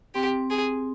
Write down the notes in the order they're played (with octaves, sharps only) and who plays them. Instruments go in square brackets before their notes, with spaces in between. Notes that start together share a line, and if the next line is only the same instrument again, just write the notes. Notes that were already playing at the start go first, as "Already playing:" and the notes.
[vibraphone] C4 [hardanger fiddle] G4
[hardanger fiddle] G#4